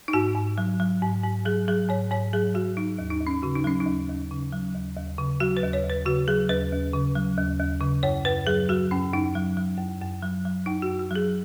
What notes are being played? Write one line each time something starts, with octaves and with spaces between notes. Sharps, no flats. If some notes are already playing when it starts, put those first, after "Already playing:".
D#4
G#2 F#4
G#2
F#3
F#3
G#2
G#2
F#3 G#4
F#3 G#4
G#2 C#5
G#2 C#5
F#3 G#4
F#3 F#4
F#3 D#4
D#2
D#4
D#2
C#4
C#3 F#4
D#4
F#3 C#4
D#4
D#2
D#2
C#3
F#3
D#2
D#2
C#3
F#3 F#4
B4
D#2
C#5
D#2
B4
C#3 F#4
F#3 G#4
D#2 B4
D#2
C#3
F#3
D#2
D#2
C#3
F#2 C#5
F#2 B4
F#3 G#4
F#3 F#4
F#2 C#4
F#2 D#4
F#3
F#3
F#2
F#2
F#3
F#3
F#2 D#4
F#4
F#2
F#4
F#3 G#4